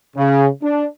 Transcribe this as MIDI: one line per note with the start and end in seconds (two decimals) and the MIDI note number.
0.17 0.47 49
0.63 0.86 62